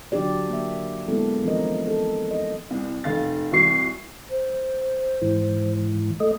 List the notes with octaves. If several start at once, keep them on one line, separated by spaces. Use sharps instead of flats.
D3 F#3 D4 F#4 G4 D5
A#3 E5
G#3 A#3 B3 E4 A4
E3 F3 C4 D4 A#4 D#5
A4
D#5
C2
F1 F5 A6
C2 E3 F#4 C#6 C7
C5
G#2 E3
A3 D#5